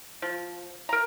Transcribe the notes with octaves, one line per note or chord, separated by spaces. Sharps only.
F3
A#4 A#5